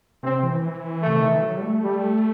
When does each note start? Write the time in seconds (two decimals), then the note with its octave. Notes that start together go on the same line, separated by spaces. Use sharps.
0.23 C3 C4
0.43 E3
0.62 E3
1.02 C3 A3
1.18 D#3
1.31 E3
1.42 F#3
1.57 G3
1.63 A3
1.82 G3